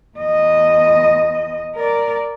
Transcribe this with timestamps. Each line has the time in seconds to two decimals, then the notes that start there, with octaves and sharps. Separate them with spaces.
0.18 E2 D#5
1.75 A#4 D5